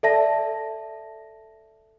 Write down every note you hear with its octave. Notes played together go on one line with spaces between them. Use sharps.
A4 D5 E5 A5 A#6